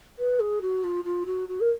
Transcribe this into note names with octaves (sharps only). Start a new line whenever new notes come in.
B4
G#4
F#4
F4
F4
F#4
F#4
A#4